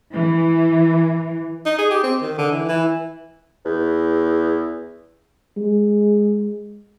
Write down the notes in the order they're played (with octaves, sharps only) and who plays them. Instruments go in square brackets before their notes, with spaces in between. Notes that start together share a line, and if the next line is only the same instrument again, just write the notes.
[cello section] E3
[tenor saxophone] D#4
G#4
G4
C4
D#3
D3
E3
E3
[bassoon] E2
[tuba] G#3